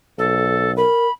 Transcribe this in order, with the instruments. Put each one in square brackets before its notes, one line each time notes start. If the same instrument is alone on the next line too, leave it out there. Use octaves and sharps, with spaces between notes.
[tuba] B1 [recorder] A4
[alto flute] A#4 [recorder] B5